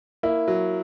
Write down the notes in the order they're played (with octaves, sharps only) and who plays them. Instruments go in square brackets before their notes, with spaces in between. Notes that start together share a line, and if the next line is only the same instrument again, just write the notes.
[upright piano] A#3 [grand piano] E4
[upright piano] F#3